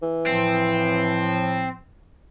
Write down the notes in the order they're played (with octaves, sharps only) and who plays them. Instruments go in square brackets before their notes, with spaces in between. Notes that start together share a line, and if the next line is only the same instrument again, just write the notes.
[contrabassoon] E3
[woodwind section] A2 F3 [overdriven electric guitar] C4